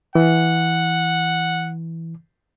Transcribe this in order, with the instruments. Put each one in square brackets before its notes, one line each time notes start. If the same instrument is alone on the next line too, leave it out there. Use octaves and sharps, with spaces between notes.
[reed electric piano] E3 [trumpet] F#5